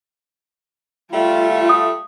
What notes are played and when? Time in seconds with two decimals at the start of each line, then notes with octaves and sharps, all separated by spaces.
1.13 G3 A3 F4
1.69 D#6